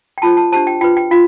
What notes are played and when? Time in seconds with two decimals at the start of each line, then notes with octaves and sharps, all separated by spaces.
0.18 G5
0.22 F4 A4 C5 A5
0.37 A5
0.52 D4 G4 C5 A5
0.67 G5
0.81 F4 B4 G5
0.97 G5
1.11 F4 F5